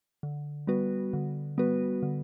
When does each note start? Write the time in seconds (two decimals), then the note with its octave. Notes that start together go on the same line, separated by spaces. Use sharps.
0.23 D3
0.67 G3 B3 F#4 B4
1.13 D3
1.58 G3 B3 F#4 B4
2.03 D3